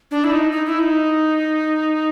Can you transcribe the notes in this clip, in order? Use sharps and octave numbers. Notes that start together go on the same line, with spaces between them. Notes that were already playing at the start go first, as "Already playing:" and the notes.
D4
E4
D#4
D#4
E4
D#4